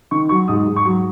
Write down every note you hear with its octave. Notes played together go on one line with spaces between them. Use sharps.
D#3 C#6
F#3 C#6
G#2 D#6
G#2
C#6
F#3